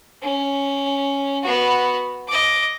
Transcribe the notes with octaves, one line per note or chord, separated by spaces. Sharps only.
C#4
B3 F#4
D#5 D6